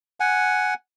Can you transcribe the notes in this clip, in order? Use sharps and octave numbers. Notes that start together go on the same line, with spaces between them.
F#5 G#5